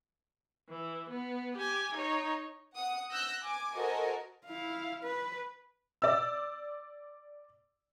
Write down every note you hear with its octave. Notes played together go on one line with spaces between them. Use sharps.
E3
B3
G4 G#5
D#4 C#5
F#5 D#6
E6 F#6 G6 A#6
G#5 D6
F#4 A4 A#4 C5 D#5 G#5
E4 F5
B4
D5 E6